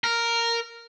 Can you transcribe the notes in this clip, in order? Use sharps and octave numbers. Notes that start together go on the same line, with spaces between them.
A#4